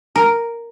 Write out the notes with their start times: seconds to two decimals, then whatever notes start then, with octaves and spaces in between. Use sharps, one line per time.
0.16 A#4